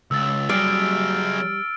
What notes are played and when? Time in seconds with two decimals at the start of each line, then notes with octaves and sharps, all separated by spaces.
0.11 C#2 E6 A6
0.49 F#3 G3 G#4 F6 A6 D7